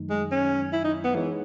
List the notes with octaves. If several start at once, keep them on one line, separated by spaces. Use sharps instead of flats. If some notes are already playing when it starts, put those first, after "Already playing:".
Already playing: F#2 D#3 F#3 A3 D#4
G#3
C#4
E4
D#4
B3
E3 G#3 D#4 G#4 C#5